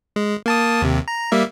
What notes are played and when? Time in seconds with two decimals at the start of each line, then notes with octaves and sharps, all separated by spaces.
0.16 G#3
0.46 A#3 A5 D#6
0.82 D#2 C3
1.08 A#5
1.32 G3 A#3 E5